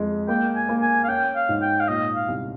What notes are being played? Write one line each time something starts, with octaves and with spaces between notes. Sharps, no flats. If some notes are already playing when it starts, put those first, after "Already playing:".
Already playing: F2 G#3
A#3 G5
G#5
A#3
G#5
F5
C#4 G5
F5
G#2
G5
F5
A#2 D#5
F5
C2